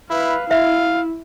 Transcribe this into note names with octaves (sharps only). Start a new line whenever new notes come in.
E4 B4 F5
E4 E5 F5